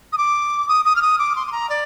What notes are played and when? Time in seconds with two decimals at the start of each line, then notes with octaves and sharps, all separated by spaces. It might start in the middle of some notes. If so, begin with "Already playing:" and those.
0.13 D#6
0.18 D6
0.68 D#6
0.85 D#6
0.96 F6
1.02 D#6
1.19 D6
1.36 C6
1.47 C6
1.52 A#5
1.70 D5